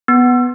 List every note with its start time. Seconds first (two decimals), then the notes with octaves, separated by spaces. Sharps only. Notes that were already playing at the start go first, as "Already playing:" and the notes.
0.08 B3